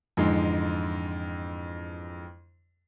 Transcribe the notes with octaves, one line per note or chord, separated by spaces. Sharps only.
F2 G#2 D3 E3 G#3